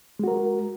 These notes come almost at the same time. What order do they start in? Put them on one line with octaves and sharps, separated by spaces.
G#3 F#4 A#4